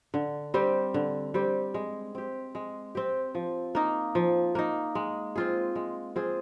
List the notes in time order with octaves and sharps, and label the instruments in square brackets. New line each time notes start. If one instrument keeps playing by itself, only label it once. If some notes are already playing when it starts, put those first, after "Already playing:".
[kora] D3
G3 C4 G4
D3
G3 C4 G4
G#3
C4 G4
G#3
C4 G4
F3
A#3 D#4
F3
A#3 D#4
G#3
C4 F4 G#4
G#3
C4 F4 G#4